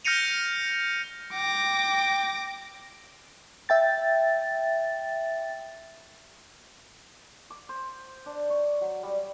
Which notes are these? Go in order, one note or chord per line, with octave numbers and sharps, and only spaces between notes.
F6 G6 A#6 C#7 D#7 F7
G5 D6 A#6
E5 G5 A6
D6
C5
D4
C#5
F#3
G3